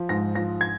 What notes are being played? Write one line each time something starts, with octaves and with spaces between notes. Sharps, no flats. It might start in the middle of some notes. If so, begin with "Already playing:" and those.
Already playing: F3
G#2 A#6
F3 A#6
G#6